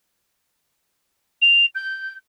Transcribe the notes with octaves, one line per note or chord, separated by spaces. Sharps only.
F7
G6